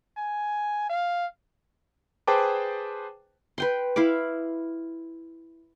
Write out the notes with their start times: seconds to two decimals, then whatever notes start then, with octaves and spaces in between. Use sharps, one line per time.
0.17 G#5
0.90 F5
2.27 G#4 B4 C5 G5 A5 D6
3.58 B4 G5 C6
3.96 E4 F5 B5 D6